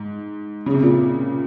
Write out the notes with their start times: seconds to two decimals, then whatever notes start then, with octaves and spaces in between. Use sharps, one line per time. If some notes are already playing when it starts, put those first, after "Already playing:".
Already playing: G#2
0.66 C#3
0.74 C3
0.83 A#2
0.91 C3